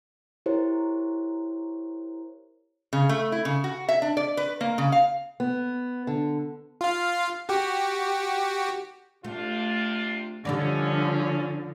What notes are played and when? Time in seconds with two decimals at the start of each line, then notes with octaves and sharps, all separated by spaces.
0.46 E4 G4 A#4 C5 C#5
2.93 C#3
3.09 A3
3.32 E4
3.45 C#3
3.64 F#4
3.89 E5
4.02 D4
4.17 D5
4.37 B4
4.61 A#3
4.78 C#3
4.92 F5
5.40 B3
6.07 D3
6.81 F4 F5
7.49 F#4 G4
9.24 C3 A3 D4 F4
10.45 D3 F3 G3 C#4 D#4 D5